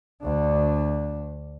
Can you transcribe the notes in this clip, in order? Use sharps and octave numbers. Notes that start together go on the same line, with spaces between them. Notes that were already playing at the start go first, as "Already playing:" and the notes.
D2 D4